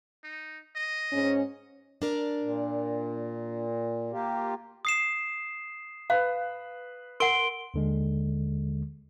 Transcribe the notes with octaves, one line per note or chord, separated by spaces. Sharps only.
D#4
D#5
G#2 C#4
D4 A#4 D5
A#2
A#3 F4 G4
D#6 C7 E7
B4 F5
A#4 F#5 C6 D7 G7
D#2 D3 G#3